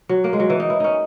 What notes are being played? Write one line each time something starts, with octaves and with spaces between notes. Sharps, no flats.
F#3
A#3
G#3
F#3
E3
D#4
E4
C#4 D#4